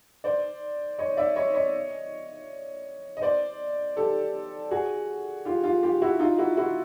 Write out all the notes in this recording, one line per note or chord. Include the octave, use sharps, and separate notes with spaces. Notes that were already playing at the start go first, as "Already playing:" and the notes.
C5 D5
C#5 D#5
D5 E5
C#5 D#5
C#5 D#5
D#5
C5 D5
G4 A4
F#4 G#4
F4 G4
F4 G4
F4 G4
E4 F#4
D#4 F4
E4 F#4
E4 F#4